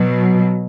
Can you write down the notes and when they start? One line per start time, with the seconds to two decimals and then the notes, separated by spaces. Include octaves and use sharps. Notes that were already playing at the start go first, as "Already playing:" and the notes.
Already playing: B2 F#3